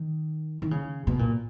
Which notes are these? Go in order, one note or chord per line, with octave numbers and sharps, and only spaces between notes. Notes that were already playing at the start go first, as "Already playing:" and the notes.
Already playing: D#3
D#3
C#3
B2
A#2